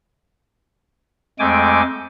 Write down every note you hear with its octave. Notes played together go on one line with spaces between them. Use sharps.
F2 G#3 A3 G5 G#5 D6